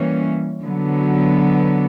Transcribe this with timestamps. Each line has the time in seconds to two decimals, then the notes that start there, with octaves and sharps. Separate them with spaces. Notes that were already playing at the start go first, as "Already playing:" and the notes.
Already playing: E3 G3 A#3 C#4
0.62 D3 F#3 B3